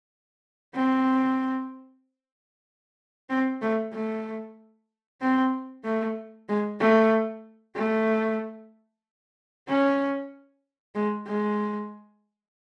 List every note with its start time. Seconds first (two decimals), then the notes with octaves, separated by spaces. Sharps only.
0.75 C4
3.30 C4
3.62 A3
3.93 A3
5.21 C4
5.85 A3
6.49 G#3
6.80 A3
7.76 A3
9.68 C#4
10.95 G#3
11.28 G#3